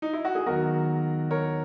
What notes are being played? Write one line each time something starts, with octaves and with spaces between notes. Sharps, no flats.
D#4
E4
F#4
G#4
D#2 D#3 F#3 B3 F#4 A#4
A#4 C#5